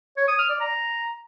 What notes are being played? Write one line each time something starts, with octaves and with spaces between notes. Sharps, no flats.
C#5
D#6
F6
D5
A#5